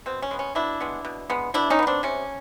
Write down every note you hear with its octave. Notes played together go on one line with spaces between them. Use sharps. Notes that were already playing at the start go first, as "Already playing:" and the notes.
B2 C4
C#4
G#3 B3
C#4
B2 D4 E4
G#3 B3
B2
G#3 B3
B2 D4 E4
C#4 D#4
G#3 B3
C4 D4
C3 C#4